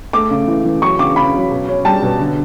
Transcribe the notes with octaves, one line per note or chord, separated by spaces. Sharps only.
A3 D6
C#3
E3
E3
F#3 C#6
C#3 D6
C#3 B5
F#3
B2
C#4
G3 A5
B2
D3